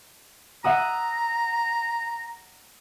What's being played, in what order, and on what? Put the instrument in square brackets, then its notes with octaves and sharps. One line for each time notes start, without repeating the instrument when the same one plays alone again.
[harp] E5 F#5 D#6 [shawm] A#5